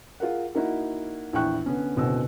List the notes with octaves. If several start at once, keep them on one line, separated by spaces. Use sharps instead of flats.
F4 G#4 A#4 F#5
A#3 D#4 E4 F#4 F#5
A#1 E2 E4 G5 C#6 F#6
D3 B3 C#4
F#1 D2 B2 C4 C#4 E6